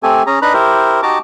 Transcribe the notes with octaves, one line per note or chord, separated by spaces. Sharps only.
A3 C4 G4 A4 G#5
C#4 G#4 A#5
D4 D#4 B4 A#5 B5 F#6
E4 G4 A#4 C5
D#4 F#4 G4 A5 A#5 D6